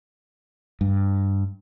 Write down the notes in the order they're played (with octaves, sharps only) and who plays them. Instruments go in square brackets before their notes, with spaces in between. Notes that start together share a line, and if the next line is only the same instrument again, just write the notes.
[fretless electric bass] G2